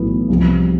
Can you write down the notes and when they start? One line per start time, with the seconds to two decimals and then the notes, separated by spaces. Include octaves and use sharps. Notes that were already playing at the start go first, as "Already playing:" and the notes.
Already playing: B1 A2 E3 B3
0.29 C2 C3 F3